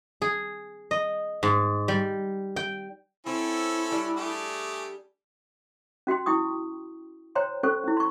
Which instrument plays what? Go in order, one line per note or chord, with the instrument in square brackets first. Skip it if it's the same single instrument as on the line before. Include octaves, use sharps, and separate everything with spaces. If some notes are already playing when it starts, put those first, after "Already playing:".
[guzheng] G#4
D#5
G#2
G3
G5
[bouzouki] C4 [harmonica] C#4 A4 [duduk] E4
[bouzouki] G3 D4
[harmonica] A3 G4 G#4
[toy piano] C#4 F#4 G5 C6
E4 G5 C#6 D#6
C5 C#5 G5 A#5 C6
C#4 A4 C5 C#6
C#4 E4
C6 C#6